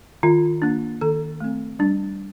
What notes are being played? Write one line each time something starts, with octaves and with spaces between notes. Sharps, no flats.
D#3 F4
A#3 D4
D#3 A4
A3 C4
G3 D4